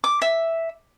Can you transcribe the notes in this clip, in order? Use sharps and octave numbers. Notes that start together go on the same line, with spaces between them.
D6
E5